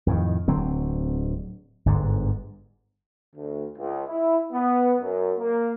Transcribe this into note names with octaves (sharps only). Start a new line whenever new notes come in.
F2 A2 C3 D#3
D1 D3 F#3 C4
G1 G#2 D3
D2
C#2
E4
B3
F#2
A#3